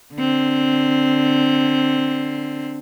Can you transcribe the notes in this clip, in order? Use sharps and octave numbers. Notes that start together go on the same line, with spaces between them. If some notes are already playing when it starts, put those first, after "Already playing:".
D3 C4